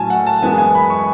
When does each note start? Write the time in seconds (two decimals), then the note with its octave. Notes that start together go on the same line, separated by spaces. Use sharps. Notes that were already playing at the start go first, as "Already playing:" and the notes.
Already playing: A2 F#3 C#4 G#5 A5
0.10 F#5
0.27 A5
0.42 F#2 E3 G#3 B3 G#5
0.58 G#5
0.75 B5
0.90 C#6